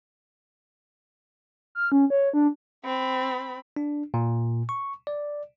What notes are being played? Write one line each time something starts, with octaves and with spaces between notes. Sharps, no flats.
F6
C#4
C#5
D4
C4 B5
D4
A#2
C#6
D5